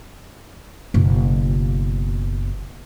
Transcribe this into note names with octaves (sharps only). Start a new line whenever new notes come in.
F#1 B2